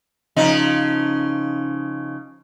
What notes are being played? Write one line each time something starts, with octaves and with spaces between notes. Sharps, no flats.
C#3 F3 D#4